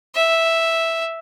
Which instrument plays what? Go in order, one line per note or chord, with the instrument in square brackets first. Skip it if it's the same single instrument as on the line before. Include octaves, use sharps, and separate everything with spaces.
[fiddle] E5